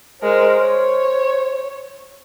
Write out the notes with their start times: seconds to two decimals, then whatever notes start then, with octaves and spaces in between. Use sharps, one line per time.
0.22 G#3 A#4 C5
0.60 C#5